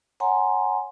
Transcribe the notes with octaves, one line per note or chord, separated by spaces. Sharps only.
C#5 F#5 G#5 A#5 C6